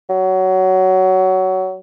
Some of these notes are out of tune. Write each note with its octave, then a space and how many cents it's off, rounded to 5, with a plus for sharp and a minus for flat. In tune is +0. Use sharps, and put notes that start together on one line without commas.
F#3 +15